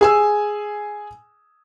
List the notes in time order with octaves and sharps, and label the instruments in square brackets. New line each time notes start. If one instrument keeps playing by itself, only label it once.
[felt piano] G#4 G#5 E6